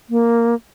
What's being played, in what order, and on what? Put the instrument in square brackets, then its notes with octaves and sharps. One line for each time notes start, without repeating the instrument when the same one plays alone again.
[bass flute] A#3